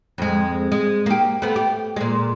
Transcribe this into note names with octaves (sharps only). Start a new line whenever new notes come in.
F2 G#3
G#3
A#3 G4
A3 B3
G4
A#2 G#3